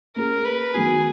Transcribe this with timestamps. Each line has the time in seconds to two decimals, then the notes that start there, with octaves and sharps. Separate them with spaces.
0.16 A#3 C#4 G#4 A#4
0.45 B4
0.74 D#3 F#3 B3 F#4 G#4